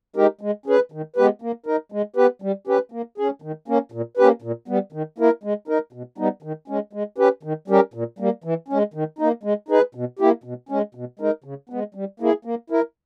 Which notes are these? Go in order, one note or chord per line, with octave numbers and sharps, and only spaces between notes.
G#3 D#4 G4 A#4
G#3
C#4 G#4 B4
D#3
G#3 B3 G4 B4
A#3
D#4 A#4
G#3
B3 G4 B4
G3
C#4 G4 B4
A#3
C#4 G#4
D#3
A#3 C#4
A#2
A#3 C#4 G4 B4
A#2
G3 B3
D#3
A#3 E4 A#4
G#3
D#4 A#4
B2
G3 B3 D#4
D#3
G#3 C#4
G#3
C#4 G4 B4
D#3
G3 C#4 G4 A#4
A#2
G3 A#3
E3
G#3 C#4
D#3
A#3 D#4
G#3
D#4 G#4 B4
B2
A#3 E4 G4
B2
G#3 C#4
B2
G#3 D#4 A#4
C#3
G#3 B3
G3
A#3 E4 G#4
A#3
E4 A#4